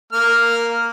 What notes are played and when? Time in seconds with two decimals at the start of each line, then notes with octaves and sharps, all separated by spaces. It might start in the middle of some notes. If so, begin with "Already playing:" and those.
0.13 A#3 F6